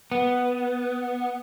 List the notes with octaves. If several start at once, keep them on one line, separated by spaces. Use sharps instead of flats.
B3